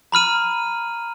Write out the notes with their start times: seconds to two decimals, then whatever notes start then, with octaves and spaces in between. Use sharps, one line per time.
0.12 A#5 B5 F6 D#7